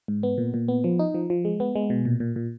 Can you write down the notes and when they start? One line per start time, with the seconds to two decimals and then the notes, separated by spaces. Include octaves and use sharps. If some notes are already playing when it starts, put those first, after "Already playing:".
0.08 G#2
0.23 B3
0.38 A#2
0.54 A#2
0.68 B3
0.84 F3
0.99 D#4
1.15 F3
1.30 F3
1.45 G#3
1.60 B3
1.75 G#3
1.90 B2
2.05 A#2
2.20 A#2
2.36 A#2